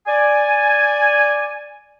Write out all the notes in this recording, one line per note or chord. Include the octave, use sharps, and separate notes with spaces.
D5 G#5